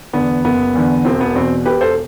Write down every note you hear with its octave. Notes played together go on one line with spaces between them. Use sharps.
E2 D3 B3
F#1 B3
E2 D3
E1 C4
B3
E2 B2 C4
E1 G4 B4
A4 C5